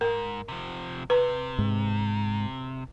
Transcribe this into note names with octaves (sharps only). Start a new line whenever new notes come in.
G#2 A#4
C3 F3
C3 B4
G#2